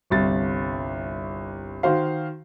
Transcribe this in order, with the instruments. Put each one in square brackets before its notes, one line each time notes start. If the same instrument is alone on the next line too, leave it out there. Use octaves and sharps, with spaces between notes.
[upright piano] G1 C2 A6
D#3 F#4 C5 F5